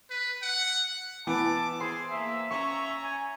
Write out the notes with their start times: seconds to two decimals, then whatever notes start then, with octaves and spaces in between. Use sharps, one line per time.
0.10 B4
0.43 F#5
1.27 E3 B3 A5 D6
1.80 G#4 C5 C6
2.11 A#3 E5
2.51 C#4 A#5 C#6
3.02 G#5